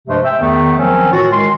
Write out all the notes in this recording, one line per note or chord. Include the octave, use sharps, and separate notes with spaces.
G2 C3 F3 G#3 A3
E5 G5
E2 D#3 A3 B3
D#3 F3 F#3 C4 C#4
A2 E3 F4 F#4
D#3 G#3 C6